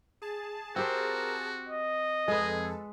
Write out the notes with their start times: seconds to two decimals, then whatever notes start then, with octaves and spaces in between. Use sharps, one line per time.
0.22 G#4 A5
0.76 C4 F#4 G4 A#4 C5
1.69 D#5
2.28 F2 G#3 G#4 A4 B4